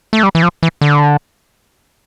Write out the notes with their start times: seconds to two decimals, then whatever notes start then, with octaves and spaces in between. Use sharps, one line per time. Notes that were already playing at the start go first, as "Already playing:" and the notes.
0.13 A3
0.23 G3
0.35 E3
0.43 F3
0.63 E3
0.81 D3